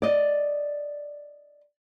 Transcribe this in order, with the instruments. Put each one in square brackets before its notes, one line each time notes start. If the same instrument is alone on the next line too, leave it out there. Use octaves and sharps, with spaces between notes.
[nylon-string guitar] D5 D#5